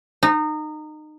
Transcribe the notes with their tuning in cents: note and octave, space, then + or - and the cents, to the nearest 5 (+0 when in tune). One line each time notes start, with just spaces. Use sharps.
D#4 -25